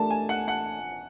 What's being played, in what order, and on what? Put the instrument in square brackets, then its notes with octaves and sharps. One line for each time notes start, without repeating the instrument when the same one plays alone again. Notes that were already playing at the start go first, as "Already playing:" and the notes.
Already playing: [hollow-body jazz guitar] A3 D4 G4 A#4 [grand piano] A5
[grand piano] G#5
F#5
F#5